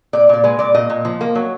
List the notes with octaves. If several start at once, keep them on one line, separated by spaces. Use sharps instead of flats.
A#2 D5
A#2 D5
G#3 B4
A#2 D5
A#2 D#5
A#2
F3
A#3
F#3